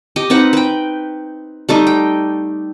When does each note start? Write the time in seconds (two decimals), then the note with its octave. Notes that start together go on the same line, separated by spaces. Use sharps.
0.16 G4 D#5
0.30 C4 D#4 B4 F#5
0.53 B4 G5
1.69 G3 A3 D#4 D#5
1.87 G5